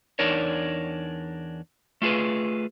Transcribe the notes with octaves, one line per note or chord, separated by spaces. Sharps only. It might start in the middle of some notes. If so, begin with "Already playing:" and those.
E2 D4 D#4 A#4 C#5
A3 F4 G#4 B4